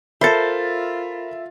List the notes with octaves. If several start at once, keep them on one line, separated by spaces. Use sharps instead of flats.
F4 A4 A#4 C5 E5 B5 A6